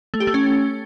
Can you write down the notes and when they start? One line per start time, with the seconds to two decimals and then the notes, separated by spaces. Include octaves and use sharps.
0.14 A3
0.20 G4
0.27 A3
0.34 C#4